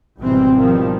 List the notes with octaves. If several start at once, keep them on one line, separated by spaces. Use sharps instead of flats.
G#1 B2 E3 G3 G#3 C4
B2 D#3 F3 G3